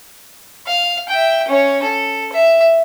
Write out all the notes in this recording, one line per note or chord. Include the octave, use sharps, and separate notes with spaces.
F5
E5 G5
C#4 C#5
A4
E5